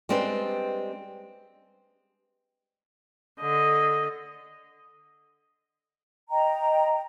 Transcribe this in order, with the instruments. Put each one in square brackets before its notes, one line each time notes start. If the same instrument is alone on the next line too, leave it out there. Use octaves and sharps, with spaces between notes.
[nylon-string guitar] G3 G#3 C4 D4 B4 C5
[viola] D3 D#5
[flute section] D#5 G5 A#5